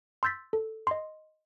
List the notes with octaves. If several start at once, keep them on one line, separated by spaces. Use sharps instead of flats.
C6 E6 G6 A6 B6
A4
D#5 C6